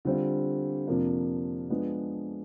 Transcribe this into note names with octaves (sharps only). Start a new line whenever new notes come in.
D3 G3 C4 F4
F2 C3 F3 A#3 D4
F3 G#3 B3 D4